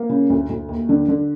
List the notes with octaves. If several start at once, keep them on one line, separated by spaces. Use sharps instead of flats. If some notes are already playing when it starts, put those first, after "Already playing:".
Already playing: A#3
C#3
D2
D2
D#2
D3
D3